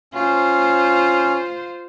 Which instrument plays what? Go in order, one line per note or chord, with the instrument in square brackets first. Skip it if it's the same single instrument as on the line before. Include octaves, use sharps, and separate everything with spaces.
[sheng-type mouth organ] C#4 [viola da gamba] F4 C5